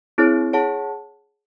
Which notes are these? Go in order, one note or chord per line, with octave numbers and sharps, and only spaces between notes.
C4 E4 G#4 C#5
G#4 C#5 F#5 A5